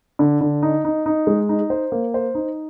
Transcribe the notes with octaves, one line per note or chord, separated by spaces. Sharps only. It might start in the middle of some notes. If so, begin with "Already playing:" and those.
D3
D3
D#4
D#4
D#4
G#3
D#4
C5
A#3
C5
D#4